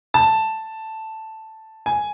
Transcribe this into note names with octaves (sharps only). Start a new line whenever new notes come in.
A5
G#5